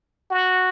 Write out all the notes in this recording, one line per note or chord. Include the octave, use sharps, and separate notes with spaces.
F#4